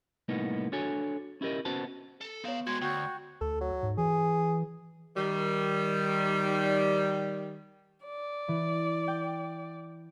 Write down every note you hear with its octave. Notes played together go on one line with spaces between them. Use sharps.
C2 A2 A#3 B3 D#4
D4 F#4 A4 C#5 G#5
C#4 E4 G4 A#4 D#5
B3 C#4 F#4 C5 A5
A4
D#3 B3 C#5 F5
G#3 F#4 C6 G#6
D2 F#4 G5 G6
D2 A4
F#3
G#2
E3 G#4
D#3 G3
D5
E3
G5